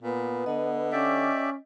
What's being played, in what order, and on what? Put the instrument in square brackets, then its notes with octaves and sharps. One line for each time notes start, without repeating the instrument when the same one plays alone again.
[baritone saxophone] A#2 [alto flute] B3
[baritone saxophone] D3 [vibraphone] D#5
[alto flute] C#4 [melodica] G4 D5 E5